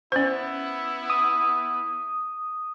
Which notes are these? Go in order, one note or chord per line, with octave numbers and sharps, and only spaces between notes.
B3 C#4 E4 C5
D#6